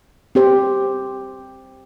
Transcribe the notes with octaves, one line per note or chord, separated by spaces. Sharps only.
C4 G4 C5